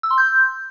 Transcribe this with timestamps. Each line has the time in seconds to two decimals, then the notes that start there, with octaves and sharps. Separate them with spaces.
0.03 E6
0.11 C6
0.18 G6